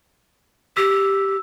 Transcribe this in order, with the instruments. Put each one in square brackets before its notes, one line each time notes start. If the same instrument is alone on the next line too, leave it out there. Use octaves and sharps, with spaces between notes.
[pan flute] G4 [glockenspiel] E6